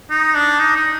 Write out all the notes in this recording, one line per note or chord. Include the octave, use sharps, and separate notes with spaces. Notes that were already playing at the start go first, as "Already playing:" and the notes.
D#4
D4
D#4
D#4